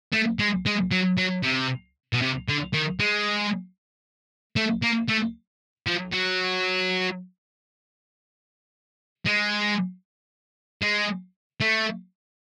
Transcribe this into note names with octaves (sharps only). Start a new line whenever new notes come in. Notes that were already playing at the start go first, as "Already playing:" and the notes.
A3
G#3
G#3
F#3
F#3
C3
B2
C3
D3
D#3
G#3
A3
A#3
A3
F3
F#3
G#3
G#3
A3